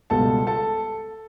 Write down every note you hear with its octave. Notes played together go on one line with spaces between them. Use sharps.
C#2 B2 G3 A4 A5
A4 A5